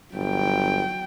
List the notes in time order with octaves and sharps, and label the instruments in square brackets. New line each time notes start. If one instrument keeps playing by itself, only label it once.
[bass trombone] G1 [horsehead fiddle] F#3 G5